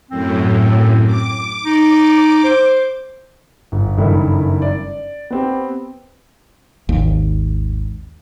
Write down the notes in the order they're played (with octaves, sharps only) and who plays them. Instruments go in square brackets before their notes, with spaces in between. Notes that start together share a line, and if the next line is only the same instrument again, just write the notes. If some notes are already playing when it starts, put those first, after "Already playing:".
[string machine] F#2 A2 [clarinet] C4
[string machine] D6
[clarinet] D#4
C5
[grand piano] G1
F#1 G2 D#3 A3 E4 E5
D5
B3 C4 G4
[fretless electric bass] G#1 D#2